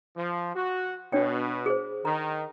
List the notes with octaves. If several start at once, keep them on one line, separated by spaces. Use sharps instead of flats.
F3
F#4
B2 D4 C#5 G5
G#4 C5
D#3 A#5